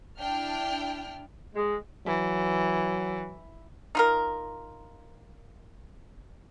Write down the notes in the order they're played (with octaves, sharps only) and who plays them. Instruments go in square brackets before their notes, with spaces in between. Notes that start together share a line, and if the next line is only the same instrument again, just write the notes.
[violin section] D4 E4 G5 A5 F6
[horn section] G#3
[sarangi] E3 [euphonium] F#3
[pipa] D#4 F4 A#4